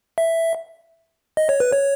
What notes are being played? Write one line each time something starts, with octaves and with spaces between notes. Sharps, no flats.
E5
D#5
C#5
B4
C#5